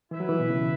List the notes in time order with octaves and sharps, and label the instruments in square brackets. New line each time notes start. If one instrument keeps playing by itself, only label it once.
[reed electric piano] E3 [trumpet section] E4 B4 E5
[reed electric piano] F#3
E3
B2
C#3